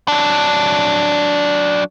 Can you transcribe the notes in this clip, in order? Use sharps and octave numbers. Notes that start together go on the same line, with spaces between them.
F#3 D4